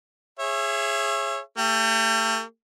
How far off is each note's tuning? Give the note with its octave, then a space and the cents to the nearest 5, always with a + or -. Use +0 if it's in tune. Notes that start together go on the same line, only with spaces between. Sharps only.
G#4 +0 C#5 -25 E5 +25
A3 +40 G4 +35